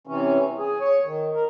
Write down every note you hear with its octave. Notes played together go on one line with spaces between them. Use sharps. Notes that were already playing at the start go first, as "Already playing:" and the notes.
C3 E3 C#4
G#4
C#5
D#3
A#4